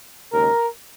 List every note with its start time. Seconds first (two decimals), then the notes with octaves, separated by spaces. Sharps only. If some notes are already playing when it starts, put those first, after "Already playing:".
0.31 D#2 C#3 G#3 A#4